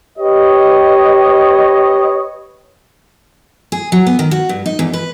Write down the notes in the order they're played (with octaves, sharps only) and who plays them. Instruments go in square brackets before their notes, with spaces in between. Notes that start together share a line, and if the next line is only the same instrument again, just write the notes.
[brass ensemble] G4 B4 C#5 D#5
[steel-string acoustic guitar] G#4
F#3
B3
D#3
F#4
G2
D#4
E2
B4